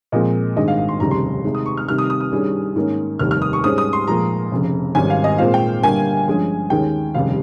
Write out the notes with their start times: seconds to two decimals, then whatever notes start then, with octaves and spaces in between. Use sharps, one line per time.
0.12 A#2 F3 G#3 C4 D#5
0.56 G#1 G2 D#3 G#3 D#5
0.68 F5
0.78 F5
0.89 C6
1.00 F1 D#2 C#3 G3 A#5
1.11 C6
1.44 C3 D#3 G#3
1.55 D#6
1.66 C#6
1.77 F6
1.88 C3 D#3 G3 F6
1.98 D#6
2.10 D#6
2.20 D#6
2.31 G2 D#3 G3 C#4 G#4
2.75 G#2 D#3 A#3 C#4
3.19 F1 D#2 D#3 G3 A#3 F6
3.31 F6
3.42 D#6
3.53 C#6
3.63 G#2 G3 C#4 G#4 C5 D#6
3.78 D#6
3.93 C6
4.08 A#2 F3 G#3 A#5
4.51 F1 F2 C#3
4.95 G#1 G#2 G3 C#4 G#5
5.10 F5
5.24 D#5
5.38 A#2 G#3 C4 F4 C5 F5
5.54 G5
5.83 G1 G2 G3 A#3 G#5
6.27 G2 F3 G#3 C#4 G#4
6.70 D#2 D#3 G#3 C#4 G5
7.14 F1 D#2 C#3 G3 F5